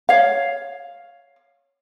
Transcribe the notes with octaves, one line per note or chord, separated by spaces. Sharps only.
C#5 F5